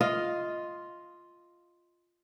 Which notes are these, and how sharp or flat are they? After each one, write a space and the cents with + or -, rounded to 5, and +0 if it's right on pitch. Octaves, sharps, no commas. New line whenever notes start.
F4 +0 D#5 +5